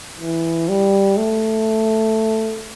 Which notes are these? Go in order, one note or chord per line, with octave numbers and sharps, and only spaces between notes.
E3
G3
A3